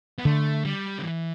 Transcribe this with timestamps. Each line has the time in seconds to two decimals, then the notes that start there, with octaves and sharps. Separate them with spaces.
0.18 B3
0.25 D3 A3
0.65 G3
0.98 D3
1.04 E3